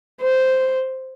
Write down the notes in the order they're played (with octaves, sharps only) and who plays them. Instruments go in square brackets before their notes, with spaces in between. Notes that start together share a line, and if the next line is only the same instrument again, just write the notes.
[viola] C5